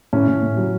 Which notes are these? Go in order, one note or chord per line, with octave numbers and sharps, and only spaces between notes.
A2 C#4
A2
A2
F#3